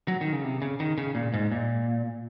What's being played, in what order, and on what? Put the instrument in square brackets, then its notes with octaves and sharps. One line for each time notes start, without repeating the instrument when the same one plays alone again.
[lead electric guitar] F#3
D#3
C#3
C3
C#3
D#3
C#3
A#2
G#2
A#2